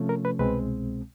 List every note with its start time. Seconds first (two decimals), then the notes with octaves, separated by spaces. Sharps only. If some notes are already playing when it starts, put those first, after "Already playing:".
Already playing: C3 F3 A3 C#4
0.09 A#4
0.25 B4
0.39 C2 B2 G#3 C4 B4